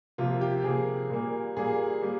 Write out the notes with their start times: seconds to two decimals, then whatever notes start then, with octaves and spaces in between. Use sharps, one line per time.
0.18 C3 F3 A#3 F4
0.41 G4
0.64 C3 F3 A#3 G#4
1.10 A#2 G3 A#3
1.57 A#2 G3 A#3 G#4
2.01 G3 A#3